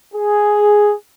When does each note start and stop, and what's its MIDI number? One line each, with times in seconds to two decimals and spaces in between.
0.14 0.94 68